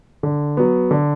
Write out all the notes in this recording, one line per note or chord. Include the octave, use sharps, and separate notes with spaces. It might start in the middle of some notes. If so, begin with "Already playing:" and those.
D3
F#3 B3
D3